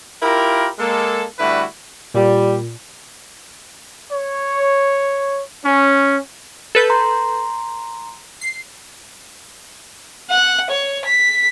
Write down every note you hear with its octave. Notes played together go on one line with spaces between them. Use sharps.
E4 F4 G4 A#4
G#3 A#3 A4
D3 G3 A3 E4 F#4 B4
A#2 G3
C#5
C#4
A4 B4 G6
A#5 C6
C7
F#5
C#5
B6